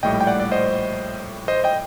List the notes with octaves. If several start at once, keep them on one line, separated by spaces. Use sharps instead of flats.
A#1 A2 G3 D#5 G5
G5
D5 F#5
D5
C5 D#5
C5 D#5
D#5 G5